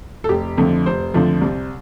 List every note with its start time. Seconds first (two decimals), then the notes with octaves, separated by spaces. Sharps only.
0.24 A4
0.29 F1 G4
0.58 F2 D3 F3 A3
0.85 F1 C5
1.14 F2 D3 F3 A3
1.41 C2